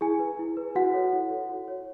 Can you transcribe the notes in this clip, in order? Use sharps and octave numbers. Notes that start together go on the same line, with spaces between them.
E4 G#4 G#5
B4
E4
B4
E4 F#4 F#5
A4 C#5
E4
A4 C#5
F#4
C#5